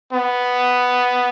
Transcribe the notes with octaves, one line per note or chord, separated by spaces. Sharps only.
B3